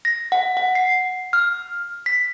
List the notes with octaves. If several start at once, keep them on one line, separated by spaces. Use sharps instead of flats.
A#6
F#5
F#5
C7
F6
B6